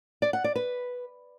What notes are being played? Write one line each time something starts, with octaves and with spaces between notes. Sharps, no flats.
D5
F#5
D5
B4